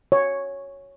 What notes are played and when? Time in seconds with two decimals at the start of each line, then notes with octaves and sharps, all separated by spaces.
0.12 C#5